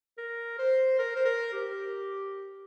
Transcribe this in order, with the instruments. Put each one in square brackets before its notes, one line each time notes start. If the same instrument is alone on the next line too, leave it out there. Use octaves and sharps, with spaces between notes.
[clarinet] A#4
C5
A#4
C5
A#4
G4